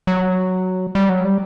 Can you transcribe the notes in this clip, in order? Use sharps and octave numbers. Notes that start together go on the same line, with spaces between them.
F#3
G3
F#3
G3